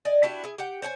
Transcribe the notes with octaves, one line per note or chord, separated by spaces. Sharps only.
D5 D#5 G#5
D4 E4 F#4 G4
E4 G#4
G4 F#5 G5
C5 C#5 G5 G#5